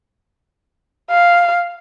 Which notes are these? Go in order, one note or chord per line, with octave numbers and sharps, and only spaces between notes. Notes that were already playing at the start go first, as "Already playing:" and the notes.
F5